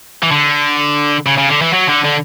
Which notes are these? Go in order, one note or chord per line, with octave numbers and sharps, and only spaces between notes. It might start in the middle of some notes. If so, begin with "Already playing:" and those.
E3
D3
C#3
C#3
D3
E3
F#3
D3
D3